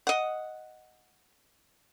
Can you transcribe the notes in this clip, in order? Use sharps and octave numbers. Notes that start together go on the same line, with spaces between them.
D#5 F#5